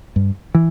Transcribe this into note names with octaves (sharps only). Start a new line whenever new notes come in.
G2
E3